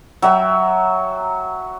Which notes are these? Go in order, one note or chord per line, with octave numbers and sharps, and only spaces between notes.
F#3 E5 G5